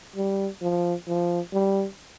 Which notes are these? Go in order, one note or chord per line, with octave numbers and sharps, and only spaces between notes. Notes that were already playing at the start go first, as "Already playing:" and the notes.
G3
F3
F3
G3